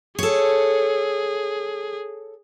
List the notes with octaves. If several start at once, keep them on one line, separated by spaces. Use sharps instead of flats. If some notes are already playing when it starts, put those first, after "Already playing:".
G#4 A4 C#5